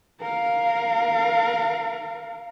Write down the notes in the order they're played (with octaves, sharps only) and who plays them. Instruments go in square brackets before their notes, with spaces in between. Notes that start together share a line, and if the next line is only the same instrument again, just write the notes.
[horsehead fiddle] A#4 F5